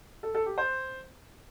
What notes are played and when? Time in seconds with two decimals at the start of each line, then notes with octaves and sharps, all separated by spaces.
0.23 A4
0.35 A4
0.46 G4
0.58 C5